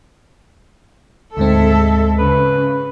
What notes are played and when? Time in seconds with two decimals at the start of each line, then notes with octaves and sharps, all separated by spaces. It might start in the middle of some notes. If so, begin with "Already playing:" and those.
1.37 D2 G#2 G#3 C4 A4 E5
2.18 C#3 B4